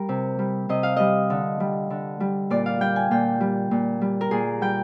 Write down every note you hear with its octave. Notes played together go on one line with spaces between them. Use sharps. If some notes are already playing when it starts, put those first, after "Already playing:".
Already playing: G3 A#4
C3
G3
C3 D#5
F5
G3 D#5
D3
G3
D3
G3
A#2 D5
F5
G3 G5
G#5
A#2 G5
G3
A#2
G3
A#4
A#2 G#4
G3 G5